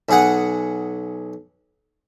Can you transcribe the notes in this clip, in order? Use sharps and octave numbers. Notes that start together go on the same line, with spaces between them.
B1 G#4 F#5